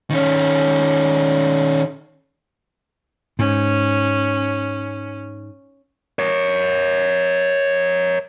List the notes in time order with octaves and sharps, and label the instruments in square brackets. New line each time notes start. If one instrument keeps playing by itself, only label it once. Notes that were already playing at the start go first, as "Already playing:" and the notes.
[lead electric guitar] D#3 C#4
[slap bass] G#2 [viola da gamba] C#4
[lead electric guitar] A#4 C#5